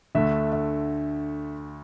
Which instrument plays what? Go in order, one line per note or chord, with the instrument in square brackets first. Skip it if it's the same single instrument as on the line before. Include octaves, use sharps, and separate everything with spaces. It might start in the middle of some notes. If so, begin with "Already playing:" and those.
[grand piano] D2 D3 A3 [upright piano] E5
[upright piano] E5